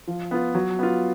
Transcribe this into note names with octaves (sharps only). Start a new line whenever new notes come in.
F3
B3 F4
F#3
B3 F4